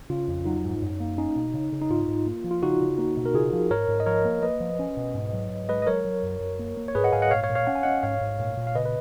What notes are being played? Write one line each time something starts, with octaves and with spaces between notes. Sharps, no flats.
C#3 F4
F2
F#3 D#4
G#2
F#2
A#3
C#4 D#4
B2
C#3
C#3
D#4
G#2 F4
G#2
A#3
F3
F4
C#3 D#4 F#4
C#3
A#3
B2
A#4
C#3 F4 G#4
F3
G#2 A#4 C#5
G#2
D#5
F3 A#4 C#5
A#3
A#3 B4 D#5
F3
C#4
B2
G#2
F#3
G#2
G#3 B4 D#5
D#5
F#3 A#4 C#5
F#3
F#2
F#2
A#3
A#3
C#5
G#2 G#4 B4
D#5 F#5
G#2 F5 G#5
D#5 F#5
A#2 C#5 F5
C#5 F5
A#2
C#5 F5
C#4 F#5
G#5
C#4 D#5 F#5
G#2 C#5 F5
G#2
A#2
A#2
F5
C#3 B4 D#5
B4